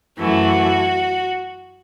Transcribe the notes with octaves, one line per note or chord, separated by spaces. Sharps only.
F#2 E3 A3 F#4